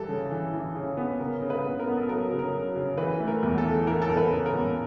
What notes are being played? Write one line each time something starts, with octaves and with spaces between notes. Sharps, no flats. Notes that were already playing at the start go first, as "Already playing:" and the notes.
Already playing: E3 G3 A4
C#3
E3
E3
C#3
B3
C#3 A#4
C#3
B4
B3
A#4
B3
A4
F#3 A#4
C#3
A#4
F#3
C#3
E3 B4
A3
A#4
E2
A4
E3
E3 A#4
A4
E2 A#4
B4
C#3
A#4
E2